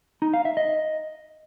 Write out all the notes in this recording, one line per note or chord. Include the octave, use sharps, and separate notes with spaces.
D#4
F5
E5
D#5